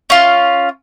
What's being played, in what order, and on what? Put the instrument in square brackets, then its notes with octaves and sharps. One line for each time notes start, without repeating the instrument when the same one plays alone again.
[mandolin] C#4 F4